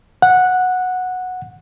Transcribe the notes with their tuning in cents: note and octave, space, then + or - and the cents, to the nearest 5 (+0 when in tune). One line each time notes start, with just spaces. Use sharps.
F#5 -10